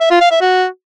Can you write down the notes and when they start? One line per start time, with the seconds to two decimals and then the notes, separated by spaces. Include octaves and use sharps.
0.01 E5
0.11 F4
0.21 F5
0.31 E5
0.41 F#4